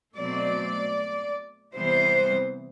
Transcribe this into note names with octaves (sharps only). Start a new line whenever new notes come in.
B2 F#3 A3 C4 D5
C3 E3 G3 B3 C5